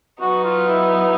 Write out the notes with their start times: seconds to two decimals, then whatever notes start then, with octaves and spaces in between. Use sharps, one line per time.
0.21 F#3 B3 D#4 F#4
0.44 F4
0.68 E4